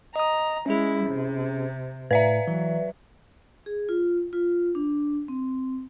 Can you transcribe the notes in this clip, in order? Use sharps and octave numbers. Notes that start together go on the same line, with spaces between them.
D#5 A#5 D#6
G#3 C#4 E4 G#4
C3
A2 B4 D5 E5
E3 F#3
G#4
F4
F4
D4
C4